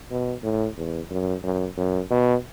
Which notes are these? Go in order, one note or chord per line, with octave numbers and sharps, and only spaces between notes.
B2
A2
E2
F#2
F#2
F#2
B2